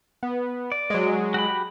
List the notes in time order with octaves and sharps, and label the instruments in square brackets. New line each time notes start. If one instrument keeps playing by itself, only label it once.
[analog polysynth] B3
[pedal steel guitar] D5
[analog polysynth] F#3 G#3
[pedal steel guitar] F#4 G4 B5